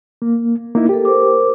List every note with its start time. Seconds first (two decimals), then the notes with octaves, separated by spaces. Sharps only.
0.22 A#3
0.75 A#3 D#4 E4
0.89 G4 A4 A#4
1.05 A#4 C5 D6